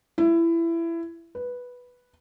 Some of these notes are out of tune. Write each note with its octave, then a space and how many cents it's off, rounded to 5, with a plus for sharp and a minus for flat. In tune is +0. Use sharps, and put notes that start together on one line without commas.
E4 +20
B4 -5